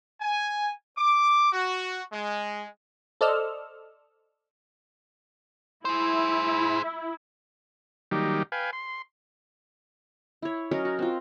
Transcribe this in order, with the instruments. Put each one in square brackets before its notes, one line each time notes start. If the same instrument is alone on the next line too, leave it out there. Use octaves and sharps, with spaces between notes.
[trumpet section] G#5
D6
F#4
G#3
[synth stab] A4 C5 D5 D#5 E6 F6
[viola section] E4 [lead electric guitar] G#4 C5
[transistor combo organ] D#3 F#3 G3 A#3 D#4 G4
B4 F5 G5 G#5
C6
[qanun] E4 C#5
F#3 C#4 A#4 D#5
F#4
C4 F4